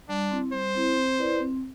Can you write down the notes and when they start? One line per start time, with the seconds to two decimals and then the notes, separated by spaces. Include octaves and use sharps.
0.09 G3 D4
0.31 C4 E4
0.52 G3 C5
0.75 C4 E4
0.97 C4
1.19 E4 B4 D5
1.40 C4